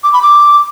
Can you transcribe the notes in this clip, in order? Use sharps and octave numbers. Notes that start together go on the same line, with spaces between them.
D6
B5
D6